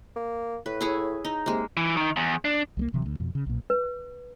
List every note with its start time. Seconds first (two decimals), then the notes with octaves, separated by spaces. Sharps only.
0.16 A#3
0.66 A2 B4
0.81 E4 G#4 C#5
1.25 D#4
1.46 C3 G#3 A#3
1.77 E3
1.97 D#3
2.17 E2
2.45 D4
2.77 C2 G3 A#3
2.93 D1 C3 E3 F#3
3.06 D2
3.20 F2 B2
3.35 C#3
3.46 B1 A#2
3.70 B4